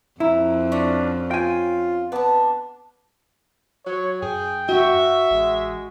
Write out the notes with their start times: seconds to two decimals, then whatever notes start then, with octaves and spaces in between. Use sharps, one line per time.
0.20 F2 E4 A#4
0.72 C#4 D4 F#5
1.31 F4 G5 G#5
2.12 B3 D4 A5
3.86 F#3 C#5
4.22 F#2 G#4 G5
4.69 F#4 E5
5.30 A1 G#3